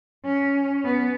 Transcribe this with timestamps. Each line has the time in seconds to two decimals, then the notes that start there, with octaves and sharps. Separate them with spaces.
0.25 C#4
0.85 B3